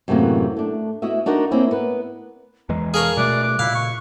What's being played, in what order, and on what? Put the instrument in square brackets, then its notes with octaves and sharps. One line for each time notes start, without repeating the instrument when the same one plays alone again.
[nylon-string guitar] F#2 A2 C3 E3 A#3 F#4
A3 D4
B3 E4 F#4 D#5 E5
D4 D#4 F#4 A#4 F#5
A#3 C4 C#4 D#4 E4
B3 A#4 B4
[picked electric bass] E2 E3 G#3 [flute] A#5
[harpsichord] G#4 A#4 C#5 [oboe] F5 [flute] A5
[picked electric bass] B2 G3 A3 [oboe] D5 [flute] F#6
[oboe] D6
[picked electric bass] A#2 C#3 [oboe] E4 [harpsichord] F5
[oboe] C#6